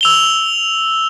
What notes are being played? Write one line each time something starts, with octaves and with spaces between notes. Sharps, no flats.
E6 F7 G7